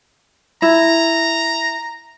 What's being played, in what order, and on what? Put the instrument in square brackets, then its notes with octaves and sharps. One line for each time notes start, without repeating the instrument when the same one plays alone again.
[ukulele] E4 [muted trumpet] A#5